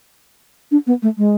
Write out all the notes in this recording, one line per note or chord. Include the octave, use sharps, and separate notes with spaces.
D4
B3
A3
G#3